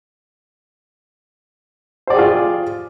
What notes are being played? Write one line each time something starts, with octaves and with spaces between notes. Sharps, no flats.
F4 G4 G#4 C5 D5